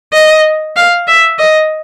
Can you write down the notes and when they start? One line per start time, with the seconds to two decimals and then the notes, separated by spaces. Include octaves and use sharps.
0.13 D#5
0.76 F5
1.07 E5
1.39 D#5